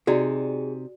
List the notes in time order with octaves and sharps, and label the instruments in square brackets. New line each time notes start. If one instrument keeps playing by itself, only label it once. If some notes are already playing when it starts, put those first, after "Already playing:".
[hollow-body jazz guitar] C3 D#4 [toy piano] F#4 D5 [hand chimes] G#4